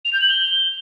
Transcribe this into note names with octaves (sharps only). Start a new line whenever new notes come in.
F7
G6
F#7
G7